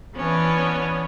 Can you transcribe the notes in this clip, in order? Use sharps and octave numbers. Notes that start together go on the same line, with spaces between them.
E3 B3 C#4 D4